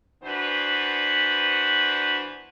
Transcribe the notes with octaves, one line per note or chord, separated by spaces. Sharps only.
E3 B3 D4 F#4 B4 C5